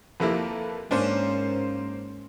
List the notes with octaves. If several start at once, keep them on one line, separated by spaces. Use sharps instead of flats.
F2 C3 A#3 E4 A4 B4
G#2 A#3 C#4 D4 C5